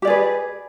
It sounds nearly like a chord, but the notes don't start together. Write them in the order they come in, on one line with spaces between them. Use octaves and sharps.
G4 D5 G#4 B4